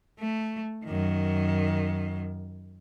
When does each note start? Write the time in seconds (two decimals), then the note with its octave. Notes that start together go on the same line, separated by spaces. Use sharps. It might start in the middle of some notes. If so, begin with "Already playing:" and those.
0.19 A3
0.85 F#2 D#3